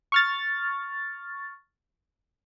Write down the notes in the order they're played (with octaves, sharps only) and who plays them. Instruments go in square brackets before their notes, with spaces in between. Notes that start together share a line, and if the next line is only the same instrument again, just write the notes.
[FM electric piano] C#6 F6 A6